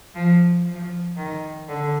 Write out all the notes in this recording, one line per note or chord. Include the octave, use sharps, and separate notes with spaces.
F3
F3
D#3
D3